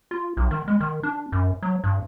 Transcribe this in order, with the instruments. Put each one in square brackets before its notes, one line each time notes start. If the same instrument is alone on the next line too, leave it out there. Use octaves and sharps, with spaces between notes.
[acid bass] F4
B1
D#3
G#3
D#3
D4
F#2
F#3
G2